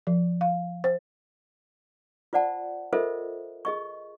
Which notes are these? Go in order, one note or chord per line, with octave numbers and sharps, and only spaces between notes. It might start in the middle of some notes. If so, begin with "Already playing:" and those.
F3
F5
C5
F4 C5 D5 F#5 A5
F4 A4 A#4 C5 D#5 E5
G#4 D#5 C#6